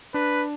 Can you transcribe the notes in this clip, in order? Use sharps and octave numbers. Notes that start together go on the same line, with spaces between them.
D4 B4